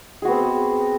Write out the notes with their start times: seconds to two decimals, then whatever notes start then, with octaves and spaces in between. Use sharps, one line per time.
0.22 G#4
0.25 F#4
0.27 B3
0.30 C4